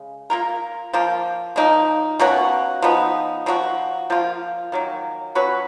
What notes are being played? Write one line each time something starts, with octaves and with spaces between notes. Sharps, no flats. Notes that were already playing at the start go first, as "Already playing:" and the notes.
Already playing: C#3 G#3
A#3 F4 A#4
F3 A#3 F4
F3 A#3 D#4
B2 A#3 C#4 F#4
F3 B3 D#4
F3 A#3 D#4 F#4
F3 A#3 F4
D#3 F#3 A#3
F#3 C#4 F#4 B4